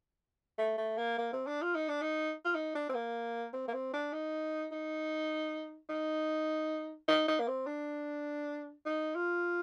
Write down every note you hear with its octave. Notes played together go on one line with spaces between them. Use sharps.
A3
A3
A#3
A#3
C4
D4
F4
D#4
D4
D#4
F4
D#4
D4
C4
A#3
C4
A#3
C4
D4
D#4
D#4
D#4
D#4
D#4
A#3
C4
D4
D#4
F4